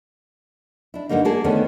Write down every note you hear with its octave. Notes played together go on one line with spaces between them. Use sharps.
D4 E4
G2 B2 D3 G3 A#3 D#4
A#3 D4 G#4 A4
D3 D#3 A3 B3 C#4 D4